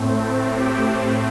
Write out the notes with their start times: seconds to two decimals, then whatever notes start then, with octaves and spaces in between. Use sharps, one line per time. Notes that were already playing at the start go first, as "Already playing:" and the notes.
Already playing: A2 A3 C4
0.57 G4 G5